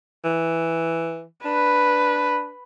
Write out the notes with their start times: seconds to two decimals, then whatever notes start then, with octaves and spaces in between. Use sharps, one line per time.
0.24 E3
1.45 D4 B4